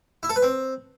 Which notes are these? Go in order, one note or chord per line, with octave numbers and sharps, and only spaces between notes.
E4
A4
B4
C4